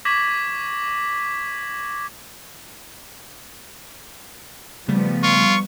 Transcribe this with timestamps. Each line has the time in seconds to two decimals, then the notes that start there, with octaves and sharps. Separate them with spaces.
0.05 C#6 D6 G#6 A#6 B6 F#7
4.88 C#3 F3 G3 A3 B3
5.23 F4 C#6